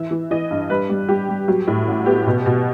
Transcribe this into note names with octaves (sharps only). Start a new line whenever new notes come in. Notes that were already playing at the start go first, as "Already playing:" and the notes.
Already playing: E3 E5
E3
E3 D#5
G2
G3 B4
G3
G3 G4
G3
F#3
A2
A1
B3 G4
B2
B2